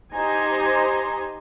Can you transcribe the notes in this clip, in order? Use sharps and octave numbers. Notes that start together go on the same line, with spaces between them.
D#4 G4 C5 G#5 A#5